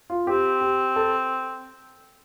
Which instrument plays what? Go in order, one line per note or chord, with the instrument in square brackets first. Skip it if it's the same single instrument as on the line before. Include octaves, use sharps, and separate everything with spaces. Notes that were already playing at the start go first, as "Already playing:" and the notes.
[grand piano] F4
[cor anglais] C4 [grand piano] G4
[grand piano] G4
A4